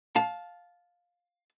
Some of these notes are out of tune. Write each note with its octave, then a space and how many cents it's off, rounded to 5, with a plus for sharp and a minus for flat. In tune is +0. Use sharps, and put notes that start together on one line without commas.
F5 +15 A5 -15